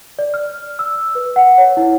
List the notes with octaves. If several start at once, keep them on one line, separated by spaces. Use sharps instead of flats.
D5
F6
E6
B4
F#5
C#5
E4